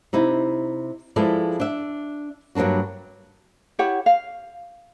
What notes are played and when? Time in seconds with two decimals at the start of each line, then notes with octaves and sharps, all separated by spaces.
0.13 C3 D#4 E4
1.16 F3 G#3 E4 A4 B4 D5
1.60 D4 E5
2.55 G2 F#3 A#3 D4 F#4
3.79 E4 G4 C#5 F#5
4.06 F5